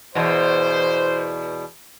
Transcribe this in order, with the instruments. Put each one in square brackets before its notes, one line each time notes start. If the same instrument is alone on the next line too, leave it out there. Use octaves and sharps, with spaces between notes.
[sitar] E2 B2 [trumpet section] C5